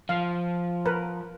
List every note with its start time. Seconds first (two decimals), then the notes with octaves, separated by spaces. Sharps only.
0.09 F3 F5
0.85 A#4 B4